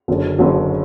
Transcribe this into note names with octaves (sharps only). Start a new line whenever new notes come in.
F#1 F#2 D3 F#3
F#1 F#2 D3 F#3